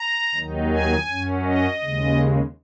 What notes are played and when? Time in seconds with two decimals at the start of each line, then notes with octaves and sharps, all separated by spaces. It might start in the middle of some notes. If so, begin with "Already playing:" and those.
Already playing: A#5
0.35 D#2 D#3 F#3 D#4
0.71 G#5
1.07 F#2 F#3 C#4
1.44 D#5
1.81 D#2 C#3 G#3